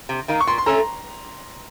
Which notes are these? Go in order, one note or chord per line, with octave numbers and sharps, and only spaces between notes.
C3
D#3 A#3 D#4
C#6
A#2 C6
C6
A3 C#4 A4 A#5